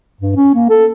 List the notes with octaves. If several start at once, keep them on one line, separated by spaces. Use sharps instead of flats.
G2
C#4
A#3
A4